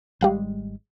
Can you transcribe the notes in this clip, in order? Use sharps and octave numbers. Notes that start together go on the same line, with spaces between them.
G#1 G3 G#3 G4 F5 F#6